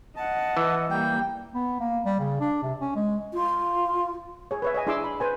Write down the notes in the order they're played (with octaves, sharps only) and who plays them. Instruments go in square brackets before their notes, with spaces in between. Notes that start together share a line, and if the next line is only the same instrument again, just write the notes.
[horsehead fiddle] D#5 F#5 [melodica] A5
[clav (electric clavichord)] E3
[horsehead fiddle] G3 A#3 [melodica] G5
[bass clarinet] B3
A#3
G3
C#3
D4
C3
C#4
G#3
[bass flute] F4
[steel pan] G#4 C#5
B4 C#5 E5
C#5 D#5 G#5
D4 E4 G#4 C6 D6 E6
B5
B4 C5 G#5